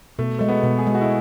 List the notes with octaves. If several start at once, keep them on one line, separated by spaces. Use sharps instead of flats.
B2 A3
G#3 A3
B3
B2
G#4
G#3
F#4
E4